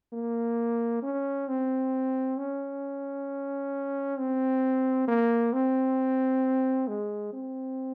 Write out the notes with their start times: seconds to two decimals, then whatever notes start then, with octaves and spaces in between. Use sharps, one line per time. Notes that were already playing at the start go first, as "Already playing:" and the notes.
0.13 A#3
1.03 C#4
1.48 C4
2.38 C#4
4.18 C4
5.08 A#3
5.53 C4
6.88 G#3
7.33 C4